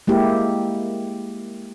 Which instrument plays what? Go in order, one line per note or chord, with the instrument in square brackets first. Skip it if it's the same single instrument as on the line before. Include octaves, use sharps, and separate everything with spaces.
[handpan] G#3 A#3 E4 G4